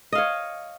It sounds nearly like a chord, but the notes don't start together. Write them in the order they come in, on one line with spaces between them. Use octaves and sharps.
D#5 F5 C#5